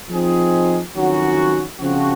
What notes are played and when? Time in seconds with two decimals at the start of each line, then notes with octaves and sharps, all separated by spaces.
0.10 F3 C4 D#4 G#4
0.95 F2 D#3 F#3 C#4 F#4
1.80 C#3 F3 C4 F#4